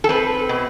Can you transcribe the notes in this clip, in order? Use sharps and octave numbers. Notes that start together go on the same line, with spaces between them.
A4
C4 B4
B2